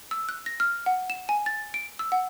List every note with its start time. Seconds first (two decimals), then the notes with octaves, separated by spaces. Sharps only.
0.11 E6
0.29 F#6
0.46 A#6
0.60 F6
0.86 F#5
1.10 E7
1.29 G#5
1.46 A6
1.74 D7
1.99 E6
2.12 F#5